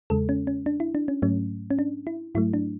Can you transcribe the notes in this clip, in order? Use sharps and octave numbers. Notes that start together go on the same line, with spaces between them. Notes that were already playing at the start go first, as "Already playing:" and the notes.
E2 C#3 G#3 A4
C#4
C#4
D4
E4
D4
C#4
G#2 F#3 A3 C#4
C#4
D4
E4
G#2 F#3 A3 E4
D4